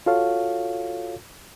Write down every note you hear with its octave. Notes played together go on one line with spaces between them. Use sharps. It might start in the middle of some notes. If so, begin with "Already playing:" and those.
F4 F#4 A4 C#5 F5